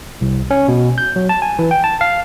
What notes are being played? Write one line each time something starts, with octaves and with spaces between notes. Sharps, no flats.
C2
C#4
B2
G6
F#3
A5
G#5
E3
G5
A5
F5